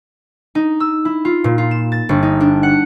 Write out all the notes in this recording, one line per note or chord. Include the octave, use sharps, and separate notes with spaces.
D#4
E6
E4
F4
A#2
F4
E7
A6
G1
D#4
D4
F#5